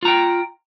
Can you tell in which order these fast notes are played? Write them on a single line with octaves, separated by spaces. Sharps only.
F4 A#5 G5